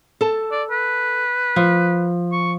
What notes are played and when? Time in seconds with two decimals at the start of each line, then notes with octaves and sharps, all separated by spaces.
0.21 A4 A5
0.52 D5
0.71 B4
1.56 F3
2.32 C#6